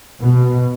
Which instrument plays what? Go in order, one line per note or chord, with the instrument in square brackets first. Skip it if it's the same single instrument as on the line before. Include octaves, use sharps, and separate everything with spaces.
[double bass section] B2